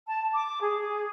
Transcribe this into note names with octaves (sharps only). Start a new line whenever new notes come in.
A5
D6
G#4